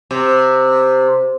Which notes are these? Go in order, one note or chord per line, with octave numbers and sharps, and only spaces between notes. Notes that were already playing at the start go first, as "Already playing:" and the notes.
C3